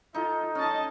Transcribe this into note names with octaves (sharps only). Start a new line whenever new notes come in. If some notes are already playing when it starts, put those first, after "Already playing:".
D#4 F4 A4
C#4 D#5 A5